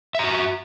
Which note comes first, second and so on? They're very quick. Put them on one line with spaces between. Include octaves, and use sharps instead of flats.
E5 A#5 F#4